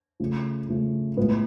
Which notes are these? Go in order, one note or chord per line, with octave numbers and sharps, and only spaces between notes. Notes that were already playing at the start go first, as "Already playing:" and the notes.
C#3 F3 A3
C#3 F3 A3
A2 G#3 B3 F4